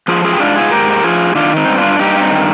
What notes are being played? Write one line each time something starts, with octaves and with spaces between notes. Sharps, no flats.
F3 F4 G#4
F4 G#4
G4
G#2 D4 F4
F4 G#4
G#2 G4 A#4
F3 F4 G#4
D#3 D4 F4
C4 D#4
G2
D4 F4
G2 D#4 G4
C4 D#4
D#3